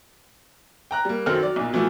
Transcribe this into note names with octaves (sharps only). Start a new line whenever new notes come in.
G5 A#5 F#6
G3 A#3
F#2 D#3 F#3 C4 A4 F6
F#3 D5
B1 A#2
B2 E3 F3 A3 B3